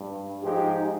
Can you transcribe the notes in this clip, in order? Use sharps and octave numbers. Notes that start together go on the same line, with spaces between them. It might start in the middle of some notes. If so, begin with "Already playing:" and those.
Already playing: G2
G#2 F3 G#3 D#4 G4